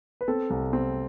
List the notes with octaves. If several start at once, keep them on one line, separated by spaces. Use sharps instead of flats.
B4
C4 A4
C2
C4